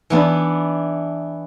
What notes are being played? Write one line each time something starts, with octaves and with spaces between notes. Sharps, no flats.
E3 B3 D4 E4